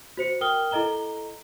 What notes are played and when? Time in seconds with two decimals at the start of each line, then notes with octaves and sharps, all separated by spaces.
0.17 F#4 C5 C#7
0.41 A#4 G5 D#6 F6 G7
0.71 E4 A4 D#5 A#5 G7